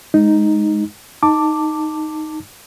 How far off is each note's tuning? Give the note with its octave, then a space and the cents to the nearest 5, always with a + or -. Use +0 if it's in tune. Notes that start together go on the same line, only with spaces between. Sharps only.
G#3 +15 D#4 +0
D#4 +0 A5 +20 D6 +0